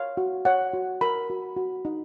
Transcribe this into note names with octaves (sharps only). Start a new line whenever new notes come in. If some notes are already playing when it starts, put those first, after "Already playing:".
Already playing: C#5 F5
F#4
C#5 F#5
F#4
A#4 B5
F#4
F#4
D#4